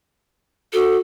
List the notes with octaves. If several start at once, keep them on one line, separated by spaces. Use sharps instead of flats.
F#4 A4